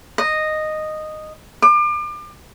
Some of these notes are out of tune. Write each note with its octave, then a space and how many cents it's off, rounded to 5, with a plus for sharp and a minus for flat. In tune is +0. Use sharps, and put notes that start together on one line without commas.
D#5 -10
D6 +35